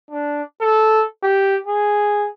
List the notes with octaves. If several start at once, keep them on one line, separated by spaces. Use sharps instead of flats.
D4
A4
G4
G#4